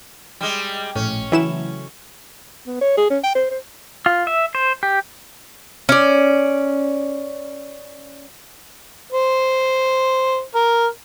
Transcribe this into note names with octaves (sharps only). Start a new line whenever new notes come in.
G3 G#3
A#1 A2 C#4
C#3 E3 F#3 A3 E4 E7
B3
C#5
G#4
C#4
G5
C5
C5
F4
E5
C5
G4
C#4 D5
C5
A#4